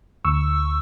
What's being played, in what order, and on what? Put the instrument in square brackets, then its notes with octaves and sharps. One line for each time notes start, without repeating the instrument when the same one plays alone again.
[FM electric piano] D2 C#6 E6